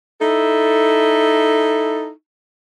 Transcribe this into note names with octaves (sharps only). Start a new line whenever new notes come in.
D#4 E4 A4